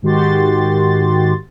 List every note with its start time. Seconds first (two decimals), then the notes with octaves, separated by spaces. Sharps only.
0.02 G#2 D#3 F#4 G4 C6 A6